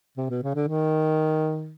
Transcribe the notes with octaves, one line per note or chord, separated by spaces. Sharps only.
C3
B2
C#3
D3
D#3